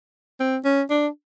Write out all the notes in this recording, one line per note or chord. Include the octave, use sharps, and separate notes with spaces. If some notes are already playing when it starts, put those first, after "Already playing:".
C4
C#4
D4